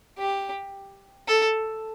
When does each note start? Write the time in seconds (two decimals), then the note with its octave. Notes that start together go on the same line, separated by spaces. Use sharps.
0.18 G4
1.28 A4